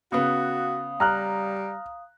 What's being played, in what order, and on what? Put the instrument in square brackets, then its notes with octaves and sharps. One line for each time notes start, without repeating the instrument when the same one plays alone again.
[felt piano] C#3 B3 [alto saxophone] F#4 [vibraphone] F5 D#6
[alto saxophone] G3 [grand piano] A#5 F6 F#6